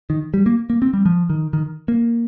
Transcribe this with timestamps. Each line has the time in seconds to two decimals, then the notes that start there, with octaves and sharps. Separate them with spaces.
0.10 D#3
0.34 G3
0.46 A#3
0.70 A#3
0.82 C4
0.93 G3
1.06 F3
1.30 D#3
1.53 D#3
1.88 A#3